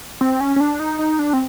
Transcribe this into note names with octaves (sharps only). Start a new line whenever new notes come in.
C4
C#4
C#4
D4
D#4
D#4
D4
C4